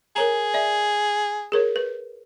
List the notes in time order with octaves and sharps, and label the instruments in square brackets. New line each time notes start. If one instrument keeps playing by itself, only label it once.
[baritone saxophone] G#4 [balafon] A#4 C#5 A#5
[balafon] D5 E5
G#4 A#4 C#5
B4